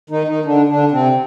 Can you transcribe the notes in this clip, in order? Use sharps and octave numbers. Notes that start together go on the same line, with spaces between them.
D#3 D#4
D#3 D#4
D3 D4
D3 D4
C3 C4